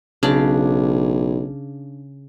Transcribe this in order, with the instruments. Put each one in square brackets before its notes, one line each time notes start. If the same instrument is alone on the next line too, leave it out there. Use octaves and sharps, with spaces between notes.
[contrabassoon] B1 [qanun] C#3 D4 D5